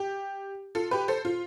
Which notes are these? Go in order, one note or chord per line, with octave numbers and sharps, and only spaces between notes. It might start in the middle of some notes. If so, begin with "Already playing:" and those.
Already playing: G4
F4 A4
G4 B4
A4 C5
F4